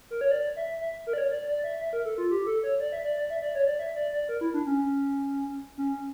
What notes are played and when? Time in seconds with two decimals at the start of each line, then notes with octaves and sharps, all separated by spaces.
0.10 A#4
0.21 C#5
0.31 D5
0.56 E5
0.81 E5
1.07 A#4
1.13 D5
1.18 C#5
1.31 D5
1.47 D5
1.64 E5
1.80 E5
1.93 A#4
2.05 A4
2.18 F4
2.31 G4
2.46 A4
2.63 C#5
2.80 D5
2.92 E5
3.05 D5
3.17 D5
3.30 E5
3.42 D5
3.55 C#5
3.67 D5
3.79 E5
3.96 D5
4.12 D5
4.29 A#4
4.41 E4
4.54 D4
4.66 C#4
5.78 C#4